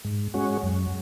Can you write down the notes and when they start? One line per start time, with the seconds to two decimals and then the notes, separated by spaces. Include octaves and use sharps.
0.05 G#2
0.34 G#3 C#4 F#4
0.63 F#2